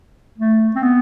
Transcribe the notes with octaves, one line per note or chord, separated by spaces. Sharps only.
A3
C4
B3